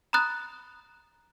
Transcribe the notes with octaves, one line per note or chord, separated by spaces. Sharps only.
A#5 B5 D#6 F#6 A6